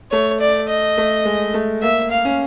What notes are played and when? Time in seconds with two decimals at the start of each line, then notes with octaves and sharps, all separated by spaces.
0.11 A3 C#5
0.40 D5
0.69 D#5
0.98 A3
1.25 G#3
1.54 A3
1.82 A#3 E5
2.11 F5
2.25 C#4